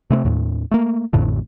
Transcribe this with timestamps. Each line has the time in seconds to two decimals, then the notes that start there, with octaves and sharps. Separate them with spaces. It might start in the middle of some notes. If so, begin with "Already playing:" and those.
0.10 C3 A3 B3 C4
0.25 D#2 A2
0.71 A3 A#3
1.13 A1 F2 A2 D3